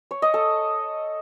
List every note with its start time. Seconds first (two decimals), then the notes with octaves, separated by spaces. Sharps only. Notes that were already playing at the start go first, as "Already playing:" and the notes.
0.11 C#5
0.22 D#5
0.34 A4